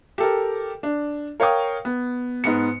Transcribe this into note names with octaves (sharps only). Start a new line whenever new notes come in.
G4 A4 A#4
D4
A#4 C#5 F5 G5 D#6
B3
G#2 B3 C#7